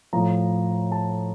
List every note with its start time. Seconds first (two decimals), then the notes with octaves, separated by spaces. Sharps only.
0.13 A2 F3 A#5
0.92 A5